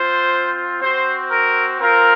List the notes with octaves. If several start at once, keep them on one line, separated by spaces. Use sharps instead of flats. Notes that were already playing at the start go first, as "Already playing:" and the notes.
Already playing: C4 F4 C5
C4 F#4 C5
A#4
C4 F4 A#4